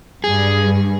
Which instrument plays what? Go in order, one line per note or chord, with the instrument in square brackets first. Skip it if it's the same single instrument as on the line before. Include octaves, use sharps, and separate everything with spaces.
[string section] G2 [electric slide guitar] G#4